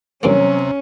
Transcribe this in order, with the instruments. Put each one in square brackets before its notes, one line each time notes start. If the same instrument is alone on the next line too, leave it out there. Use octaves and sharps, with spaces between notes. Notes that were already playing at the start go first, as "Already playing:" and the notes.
[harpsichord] G2 E3 A#3 [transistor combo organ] C3 [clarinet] F#3 [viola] C#4